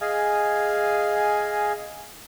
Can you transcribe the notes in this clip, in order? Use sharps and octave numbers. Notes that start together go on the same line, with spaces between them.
G#4 D#5 F5 G#5